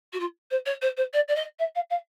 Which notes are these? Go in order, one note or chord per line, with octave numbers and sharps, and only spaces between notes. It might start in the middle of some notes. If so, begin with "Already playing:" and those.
F#4
F4
C5
C#5
C5
C5
D5
D5
D#5
E5
F5
F5